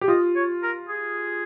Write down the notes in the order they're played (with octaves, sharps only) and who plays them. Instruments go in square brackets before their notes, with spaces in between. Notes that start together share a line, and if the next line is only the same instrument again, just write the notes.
[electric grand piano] G4
[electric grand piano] F4 [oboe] D#5
[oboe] C#5
A#4
G#4